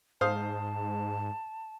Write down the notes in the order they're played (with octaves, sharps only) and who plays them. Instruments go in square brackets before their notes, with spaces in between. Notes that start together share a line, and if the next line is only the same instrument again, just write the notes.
[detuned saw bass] G#2 [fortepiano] C5 F5 D#6 [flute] A5